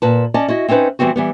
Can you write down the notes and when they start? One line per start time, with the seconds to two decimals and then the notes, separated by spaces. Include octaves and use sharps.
0.02 A#2 B4 A5
0.34 C#4 D5 D#5 A5
0.48 E4 F#4 D#5
0.68 C4 C#4 D#4 B4 C5
0.99 E3 G3 G#3 B3 C4 F#4
1.16 E3 G3 B3